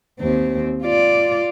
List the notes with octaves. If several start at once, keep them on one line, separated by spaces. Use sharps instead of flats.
D#2 C4
F4 D5